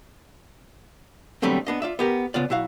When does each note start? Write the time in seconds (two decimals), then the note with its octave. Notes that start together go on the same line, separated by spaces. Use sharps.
1.42 D3 F#3 G3 A3 B3 C4
1.67 B3 D4 D#5
1.82 F4 D5 E5
1.99 B3 G4 A#4
2.34 C#3 B3 F4 D5
2.50 B1 E4 F#4 F5